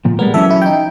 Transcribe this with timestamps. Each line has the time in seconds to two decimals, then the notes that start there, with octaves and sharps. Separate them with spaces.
0.05 A#2 F3
0.19 G3 G#3 B3 A#4
0.34 E3 F#3 C#4 A4 E5
0.50 E4
0.62 D#4 G5